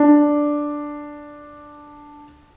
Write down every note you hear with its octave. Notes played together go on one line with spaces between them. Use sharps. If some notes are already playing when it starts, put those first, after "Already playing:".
Already playing: D4